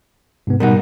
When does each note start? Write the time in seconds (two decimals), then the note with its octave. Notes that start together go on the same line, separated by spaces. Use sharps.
0.47 G#2 C3 B3
0.60 B2 G3 D#4 A#4 F#5